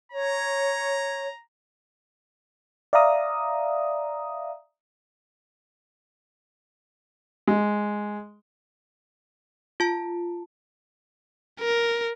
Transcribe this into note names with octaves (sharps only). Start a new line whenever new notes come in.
C#5 A#5
D5 E5 F5 A#5 D#6
G#3
F4 A5
A#4